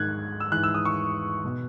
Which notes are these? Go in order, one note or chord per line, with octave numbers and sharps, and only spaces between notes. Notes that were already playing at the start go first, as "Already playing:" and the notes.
Already playing: G#2 D#3 F#6 G#6
E6
G#2 E3 F#6
E6
D#6
C#6
B2